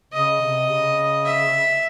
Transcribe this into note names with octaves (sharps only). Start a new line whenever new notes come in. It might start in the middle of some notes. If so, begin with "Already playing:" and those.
C#3 D#5
C3
C#3
E5